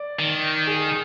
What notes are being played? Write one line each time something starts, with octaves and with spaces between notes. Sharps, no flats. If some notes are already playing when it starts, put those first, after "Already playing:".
Already playing: D5
D#3
G#4